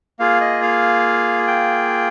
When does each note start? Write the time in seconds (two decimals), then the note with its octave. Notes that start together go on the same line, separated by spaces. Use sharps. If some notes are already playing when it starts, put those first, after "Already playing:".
0.20 A#3 F4 G#4 F5
0.41 D#5
0.62 F5
1.47 G5